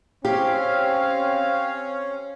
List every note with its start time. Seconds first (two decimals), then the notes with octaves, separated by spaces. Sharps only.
0.25 C4 C#4 G4 F5